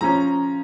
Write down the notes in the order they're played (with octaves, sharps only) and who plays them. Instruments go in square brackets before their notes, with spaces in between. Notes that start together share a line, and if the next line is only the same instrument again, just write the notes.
[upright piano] F3 C#4 A#5